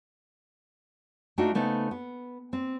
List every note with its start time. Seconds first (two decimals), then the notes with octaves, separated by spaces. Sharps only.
1.38 A3 D4 D#4 F4 F#4
1.54 C#3 A3 B3 D#4 C5
1.91 B3
2.53 C4